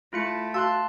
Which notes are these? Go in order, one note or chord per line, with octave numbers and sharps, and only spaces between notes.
A3 E4 F4 C#7
F#4 F5 A5 C6 E6 F#6